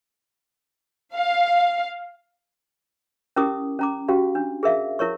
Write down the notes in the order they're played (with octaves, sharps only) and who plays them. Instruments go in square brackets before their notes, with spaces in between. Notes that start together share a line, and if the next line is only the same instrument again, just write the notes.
[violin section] F5
[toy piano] C#4 E4 G4 A#4 D6 D#6
C#4 A#5 D6
C#4 F#4 G4 F5
D4
G#4 A#4 E5 F5
E4 A#4 C#5 C#6